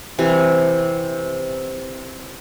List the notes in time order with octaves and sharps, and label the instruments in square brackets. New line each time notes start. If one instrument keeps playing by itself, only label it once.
[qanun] C3 E3